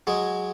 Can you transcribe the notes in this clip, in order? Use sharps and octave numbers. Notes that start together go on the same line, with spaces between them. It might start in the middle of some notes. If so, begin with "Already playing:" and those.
F#3 G#3